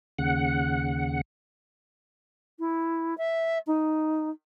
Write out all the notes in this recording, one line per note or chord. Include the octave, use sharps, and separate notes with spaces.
D#2 C#3 F#5
E4
E5
D#4